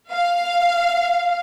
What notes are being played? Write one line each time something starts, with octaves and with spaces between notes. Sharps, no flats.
F5